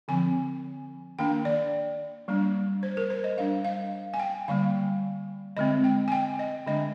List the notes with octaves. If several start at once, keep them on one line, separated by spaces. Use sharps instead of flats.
D3 F3 C4 G#5
D#3 A#3 D4 G5
D5
G3 A#3 D4
C5
A#4
C5
D#5
G3 D4 F5
F5
G#5
G5
D3 G3 A#3 F5
D3 G#3 C4 D#5
G5
G#5
G5
D#5
D3 G#3 D4 D#5